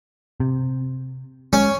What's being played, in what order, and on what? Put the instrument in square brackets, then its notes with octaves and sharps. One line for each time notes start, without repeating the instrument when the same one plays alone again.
[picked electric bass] C3
[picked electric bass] G#3 [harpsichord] C#4